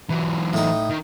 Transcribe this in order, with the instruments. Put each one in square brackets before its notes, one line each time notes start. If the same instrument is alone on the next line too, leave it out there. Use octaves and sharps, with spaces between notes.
[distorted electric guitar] E3 F#3
[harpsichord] A2 D#4
[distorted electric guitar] D#3